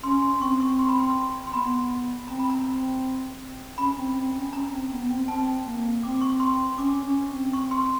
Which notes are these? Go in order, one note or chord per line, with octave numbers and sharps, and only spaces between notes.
C#4 C6
C6
C4 C#6
C#6
C6
B5
C6
C6
B3 B5
C4 A#5
B5
A#5
C#4 B5
C4
C4
C#4
C#4 A#5
C4
B3
C4
C4 A5
A#3
C4 D6
C#6
C6
C#4 D6
C#4
C4
C#6
C6